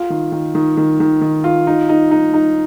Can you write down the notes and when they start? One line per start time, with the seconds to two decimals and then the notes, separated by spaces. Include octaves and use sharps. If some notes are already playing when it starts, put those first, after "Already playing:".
Already playing: F4
0.10 D#3
0.32 D#3
0.55 D#3
0.77 D#3
1.00 D#3
1.21 D#3
1.44 F4
1.67 D#4
1.89 D#4
2.11 D#4
2.34 D#4